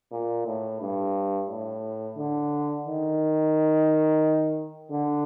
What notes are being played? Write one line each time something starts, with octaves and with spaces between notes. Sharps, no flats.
A#2
A2
G2
A2
D3
D#3
D3